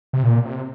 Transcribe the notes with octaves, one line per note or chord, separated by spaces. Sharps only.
C3
A#2
C3